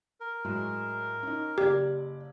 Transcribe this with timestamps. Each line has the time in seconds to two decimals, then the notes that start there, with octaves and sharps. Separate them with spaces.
0.20 A#4
0.44 A2 F#3 G#3
1.23 C#4 D#4
1.58 F#1 G4 D5 G#6